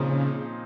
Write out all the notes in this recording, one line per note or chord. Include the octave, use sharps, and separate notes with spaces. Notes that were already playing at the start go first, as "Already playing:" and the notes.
Already playing: A#2 C#3 F3 C4 D#4